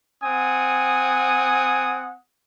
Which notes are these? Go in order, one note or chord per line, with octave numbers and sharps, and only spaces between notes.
C4 F#5 G#5 D#6